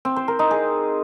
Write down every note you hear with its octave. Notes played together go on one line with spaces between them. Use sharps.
C4
C5
A#4
D#4
G#4